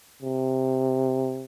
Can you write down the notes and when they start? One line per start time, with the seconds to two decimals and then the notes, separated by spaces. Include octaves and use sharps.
0.22 C3